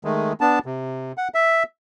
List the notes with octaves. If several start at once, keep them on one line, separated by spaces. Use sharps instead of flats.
D#3 G#3 A3
B3 D4 A5
C3
F#5
E5